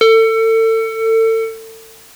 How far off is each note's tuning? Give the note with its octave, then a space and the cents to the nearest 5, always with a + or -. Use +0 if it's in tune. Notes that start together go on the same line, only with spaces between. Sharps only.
A4 +30